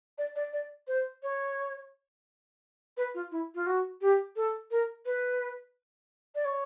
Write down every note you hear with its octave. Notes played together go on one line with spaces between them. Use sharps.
D5
D5
D5
C5
C#5
B4
F4
E4
F4
F#4
G4
A4
A#4
B4
D5
C#5